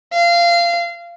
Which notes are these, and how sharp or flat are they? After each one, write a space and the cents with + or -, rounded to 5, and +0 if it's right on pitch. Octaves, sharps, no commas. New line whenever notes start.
F5 -20